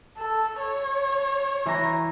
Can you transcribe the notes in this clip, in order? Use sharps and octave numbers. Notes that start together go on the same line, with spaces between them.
A4
C#5
E3 A#5